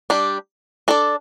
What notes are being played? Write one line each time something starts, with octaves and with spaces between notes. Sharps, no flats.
G3 D4 G4
D4 A4 D5